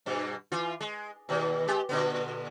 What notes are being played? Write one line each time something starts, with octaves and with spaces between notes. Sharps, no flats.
G2 B2
E3 F4
G#3
D#2 B2
G#3 G4
A#2 D3 B3